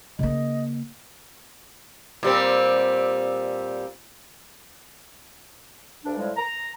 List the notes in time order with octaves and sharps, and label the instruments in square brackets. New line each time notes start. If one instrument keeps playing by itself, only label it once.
[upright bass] C#3 A#3 [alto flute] D#5
[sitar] A#2 G3 C4
[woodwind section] D2 G2 D4
A2 F3 G3 G#3
A#5